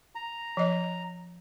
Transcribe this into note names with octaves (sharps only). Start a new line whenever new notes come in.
A#5
F3 D#5